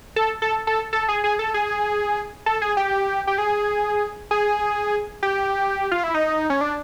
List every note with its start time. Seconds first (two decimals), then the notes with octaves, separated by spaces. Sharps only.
0.16 A4
0.42 A4
0.67 A4
0.93 A4
1.08 G#4
1.24 G#4
1.39 A4
1.54 G#4
2.46 A4
2.62 G#4
2.77 G4
3.27 G4
3.38 G#4
4.31 G#4
5.23 G4
5.92 F4
6.04 E4
6.14 D#4
6.50 C#4
6.61 D4